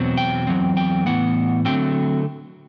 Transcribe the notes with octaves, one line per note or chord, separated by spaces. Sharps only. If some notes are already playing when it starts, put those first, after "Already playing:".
Already playing: E2 B2 F#3 C4
G5
E2 C3 F#3 C4
G5
A2 E3 B3 F#5
D3 F#3 A3 C4 G5